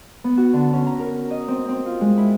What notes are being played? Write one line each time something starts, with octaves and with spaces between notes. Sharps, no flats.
B3
F#4
D3
C#4
A#5
A#4
D#5
C4
C4
F4
G#3
E4